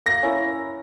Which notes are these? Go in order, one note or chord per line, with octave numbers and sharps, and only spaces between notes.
A#3 A#6
C#4 E4 A#4